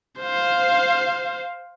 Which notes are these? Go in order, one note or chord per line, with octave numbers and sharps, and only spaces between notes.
C5 F5